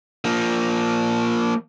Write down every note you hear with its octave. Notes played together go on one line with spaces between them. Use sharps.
F3 A#3